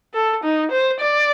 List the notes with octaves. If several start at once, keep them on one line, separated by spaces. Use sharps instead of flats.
A4
D#4
C5
D5